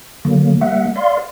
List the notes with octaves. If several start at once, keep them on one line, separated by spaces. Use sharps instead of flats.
D3 F#3 A#3
G3 A#3 E5 F#5
D5 F5 C6